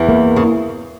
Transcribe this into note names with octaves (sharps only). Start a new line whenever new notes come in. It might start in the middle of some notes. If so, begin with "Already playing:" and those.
Already playing: E2 E3
A#3
C#3